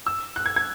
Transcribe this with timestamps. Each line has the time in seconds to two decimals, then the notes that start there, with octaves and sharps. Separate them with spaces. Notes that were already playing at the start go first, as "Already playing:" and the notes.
0.06 E6
0.36 F#6
0.46 G#6
0.56 G#6